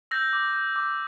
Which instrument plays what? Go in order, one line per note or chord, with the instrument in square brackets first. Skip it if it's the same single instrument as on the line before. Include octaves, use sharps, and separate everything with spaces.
[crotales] E6 G6 A#6
D6
G6
D6